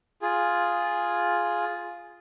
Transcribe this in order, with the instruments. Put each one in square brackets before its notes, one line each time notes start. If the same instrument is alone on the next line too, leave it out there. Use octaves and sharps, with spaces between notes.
[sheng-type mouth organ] F4 G#4